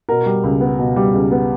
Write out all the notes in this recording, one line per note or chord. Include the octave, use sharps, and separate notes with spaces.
B2 A#4
G3
C#2
B3
B2
G3
C#2
B3